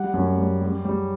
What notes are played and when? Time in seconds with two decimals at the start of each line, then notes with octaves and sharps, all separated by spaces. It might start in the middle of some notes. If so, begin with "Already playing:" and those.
Already playing: G3 F#5
0.14 F#2
0.38 G3
0.61 G3
0.85 G3